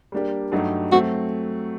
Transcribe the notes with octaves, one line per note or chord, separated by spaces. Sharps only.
G3 A#3 D4 G4
G2 F#3 A3 D#4 G4
F#3 A3 C4 F#4